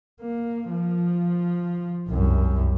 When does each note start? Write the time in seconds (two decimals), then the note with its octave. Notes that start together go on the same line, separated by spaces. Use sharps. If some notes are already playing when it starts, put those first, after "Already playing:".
0.21 A#3
0.70 F3
2.09 C2 F#2